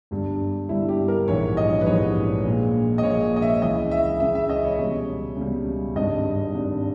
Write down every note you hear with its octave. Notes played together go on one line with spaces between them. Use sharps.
G1 G2 G3
G1 G2 G3 E4
G4
A#4
A#1 G#2 E3 G3 C#5
D#5
B4
A#1 G#2 E3 G3 C#5
A#1 A#2 G#3
D#5
A#1 A#2 G#3 C#5
D#5
E5
C#2 C#3 E3 D#5
E5
C#2 C#3 E3 E5
E5
D#5
C#5
C#2 B2 G3 C#5
C#2 B2 G3
G#1 G2 G3 D#5
G#1 G2 G3